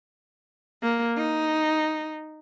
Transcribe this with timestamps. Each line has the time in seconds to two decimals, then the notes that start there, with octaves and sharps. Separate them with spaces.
0.83 A#3
1.17 D#4